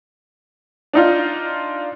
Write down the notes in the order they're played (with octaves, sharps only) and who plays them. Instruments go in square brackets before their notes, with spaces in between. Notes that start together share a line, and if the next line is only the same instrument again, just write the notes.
[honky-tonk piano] D4 D#4 F4